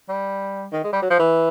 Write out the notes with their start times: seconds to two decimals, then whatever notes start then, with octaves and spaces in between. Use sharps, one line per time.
0.09 G3
0.72 D#3
0.84 G#3
0.93 G3
1.02 F#3
1.10 F3
1.19 E3